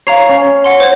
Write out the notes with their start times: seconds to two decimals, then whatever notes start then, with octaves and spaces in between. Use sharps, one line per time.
0.07 C#5 F5 A#5 C7
0.29 C#4
0.64 F#5 C6
0.80 C5 C#5